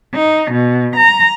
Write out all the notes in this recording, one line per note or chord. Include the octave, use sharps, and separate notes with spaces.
D#4
B2
A#5